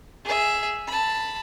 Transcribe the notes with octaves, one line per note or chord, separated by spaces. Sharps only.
G#4 E5
A5 B5